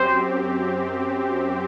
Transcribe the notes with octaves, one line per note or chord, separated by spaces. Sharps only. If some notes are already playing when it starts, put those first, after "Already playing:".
Already playing: F#2 C4 G4 C5